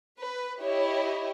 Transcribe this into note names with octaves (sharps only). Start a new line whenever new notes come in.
B4
E4 G4 C#5 D#5